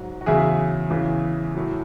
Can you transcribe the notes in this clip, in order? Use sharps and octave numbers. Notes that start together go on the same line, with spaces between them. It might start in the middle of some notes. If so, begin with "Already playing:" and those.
Already playing: G#2 F#3
F#4
E2 C#3 F#3 E4 G#4
E2 C#3 E3
A2 F#3